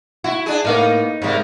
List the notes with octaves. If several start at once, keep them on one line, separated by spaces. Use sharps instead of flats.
E4 F#4
D4 G#4
A2 A#3 B3 D#4
G#2 C3 G3 G#3 A#3